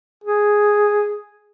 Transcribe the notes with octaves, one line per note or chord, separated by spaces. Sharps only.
G#4